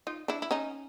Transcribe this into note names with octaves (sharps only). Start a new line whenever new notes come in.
D#4 F4
D4 E4
E4
C#4 D#4